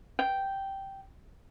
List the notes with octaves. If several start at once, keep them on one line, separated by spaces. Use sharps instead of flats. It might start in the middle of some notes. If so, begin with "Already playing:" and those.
G5